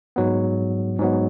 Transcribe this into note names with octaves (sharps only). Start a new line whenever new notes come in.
G#2 F#3 B3
G#2 F#3 B3